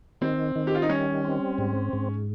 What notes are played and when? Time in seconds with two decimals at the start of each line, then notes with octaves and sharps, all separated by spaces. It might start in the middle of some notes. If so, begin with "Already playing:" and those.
0.21 D#3 C4
0.56 D#3
0.67 G4
0.75 F4
0.82 D#4
0.89 G3 C#4
1.25 C4
1.58 G#2
1.93 G#2